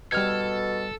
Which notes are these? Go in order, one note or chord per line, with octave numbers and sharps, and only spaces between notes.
B2 G3 A4 F6 G#6